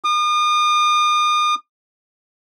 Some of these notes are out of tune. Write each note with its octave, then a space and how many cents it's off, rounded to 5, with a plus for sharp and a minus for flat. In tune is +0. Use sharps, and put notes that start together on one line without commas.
D#6 -40